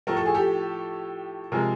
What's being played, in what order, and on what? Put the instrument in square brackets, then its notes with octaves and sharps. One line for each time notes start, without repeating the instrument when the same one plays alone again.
[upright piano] A2 F3 A3 A#4
A4
G#4
G4 A4
C3 F3 G#3 G#4 A#4